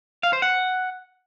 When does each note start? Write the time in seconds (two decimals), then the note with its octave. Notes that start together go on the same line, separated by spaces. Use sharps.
0.23 F5
0.33 C5
0.42 F#5